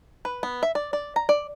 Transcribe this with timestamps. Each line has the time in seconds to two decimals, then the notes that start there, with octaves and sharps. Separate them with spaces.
0.25 B4
0.43 B3
0.63 E5
0.75 D5
0.93 D5
1.16 A#5
1.29 D5